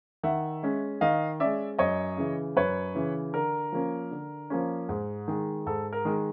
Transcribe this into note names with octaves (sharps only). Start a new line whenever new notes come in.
D#3 E5 F#5
G#3 C#4
D#3 D#5 F5
G#3 C#4 D5 E5
F#2 C#5 D#5
C#3 E3
F#2 B4 C#5
C#3 E3
D3 A#4
F3 A#3 C#4
D3
F3 A#3 C#4
G#2
D#3 G#3
G#2 A4
A#4
D#3 G#3